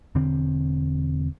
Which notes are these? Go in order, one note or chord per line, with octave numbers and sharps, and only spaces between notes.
E1 D3 C4